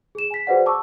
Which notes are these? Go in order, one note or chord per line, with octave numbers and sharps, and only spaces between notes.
G#4 E7
G#5 B6
F#4 G#4 B4 C5 D5 F#5
A5 C#6 D6 E6